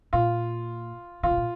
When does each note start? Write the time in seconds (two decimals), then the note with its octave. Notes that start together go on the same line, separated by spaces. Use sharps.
0.13 A#2 F4
1.23 D3 F4
1.31 C3
1.37 A#2